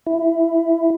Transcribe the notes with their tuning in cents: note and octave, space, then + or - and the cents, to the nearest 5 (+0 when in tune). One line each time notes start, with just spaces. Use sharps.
E4 +10